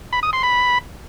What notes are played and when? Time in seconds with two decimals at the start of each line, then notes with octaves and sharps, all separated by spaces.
0.13 B5
0.23 D#6
0.33 C6
0.43 B5